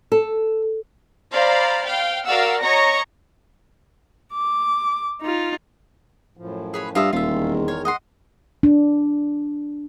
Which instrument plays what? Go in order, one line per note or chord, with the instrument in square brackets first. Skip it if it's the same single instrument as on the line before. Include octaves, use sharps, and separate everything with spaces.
[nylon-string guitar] A4
[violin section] C5 D5 F5 A#5 B5
F5 G5
F#4 A#4 D5 F5 F#5 E6
C#5 D#5 A#5 C#6 A#6
[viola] D6
D#4 F4
[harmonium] F#2 A2 F3
[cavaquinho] G#4 B4 C#5
[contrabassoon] G2 [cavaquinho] F4 D#5 E5
[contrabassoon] D#1 [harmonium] E2 D#3 G#3 [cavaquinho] F4 E5
[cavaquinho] A#4 C#5
D#5 F#5 C6
[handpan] D4